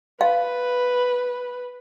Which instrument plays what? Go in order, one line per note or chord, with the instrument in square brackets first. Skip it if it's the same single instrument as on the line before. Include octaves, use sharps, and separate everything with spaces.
[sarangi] B4 [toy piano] F5